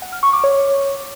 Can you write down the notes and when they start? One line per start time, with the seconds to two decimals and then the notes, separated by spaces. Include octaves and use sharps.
0.02 F#5
0.12 F6
0.23 C#6
0.33 D6
0.44 C#5